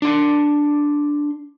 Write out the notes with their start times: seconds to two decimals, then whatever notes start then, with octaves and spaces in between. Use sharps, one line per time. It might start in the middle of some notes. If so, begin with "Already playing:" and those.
0.02 D4 C6